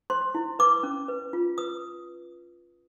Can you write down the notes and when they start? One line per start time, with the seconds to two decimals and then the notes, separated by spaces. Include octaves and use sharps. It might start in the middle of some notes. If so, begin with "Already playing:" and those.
0.10 C5 C6
0.35 E4
0.59 B4 D6
0.83 C#4
1.08 B4
1.33 F4
1.58 B4 D#6